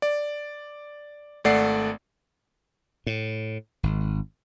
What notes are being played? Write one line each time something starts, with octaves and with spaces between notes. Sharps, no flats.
D5
G#1 A3 D5 F#5 C7
A2
G#1